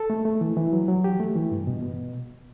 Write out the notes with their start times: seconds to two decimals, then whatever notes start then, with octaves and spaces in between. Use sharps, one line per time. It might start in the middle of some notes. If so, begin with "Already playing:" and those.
Already playing: A4
0.10 A3
0.25 A3
0.41 E3
0.57 E3
0.72 F#3
0.88 F#3
1.04 G4
1.20 A3
1.36 E3
1.51 G2
1.67 B2
1.83 B2